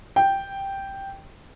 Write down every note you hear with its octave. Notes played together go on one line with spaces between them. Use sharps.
G5